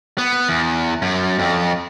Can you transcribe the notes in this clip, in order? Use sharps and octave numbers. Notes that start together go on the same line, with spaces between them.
B3
E2
F#2
F2